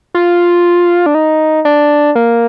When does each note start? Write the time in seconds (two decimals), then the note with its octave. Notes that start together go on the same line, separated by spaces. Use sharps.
0.15 F4
1.06 D4
1.15 D#4
1.65 D4
2.15 A#3